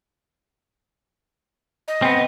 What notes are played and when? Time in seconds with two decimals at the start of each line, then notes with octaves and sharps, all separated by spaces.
1.88 D#5
2.02 B3 C4